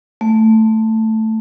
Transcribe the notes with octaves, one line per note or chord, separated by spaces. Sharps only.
A3